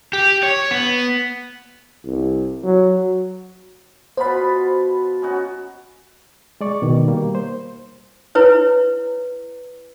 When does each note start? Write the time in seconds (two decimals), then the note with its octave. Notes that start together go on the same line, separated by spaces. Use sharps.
0.13 G4
0.43 C#5
0.71 B3
2.04 C2
2.63 F#3
4.17 B2 B3 F4 C5 B5
5.22 C#4 D#4 F#4
6.61 G#3 D5 C#6
6.82 B2 D#3
7.08 G3 A#3
7.35 C5
8.35 E4 B4 C#5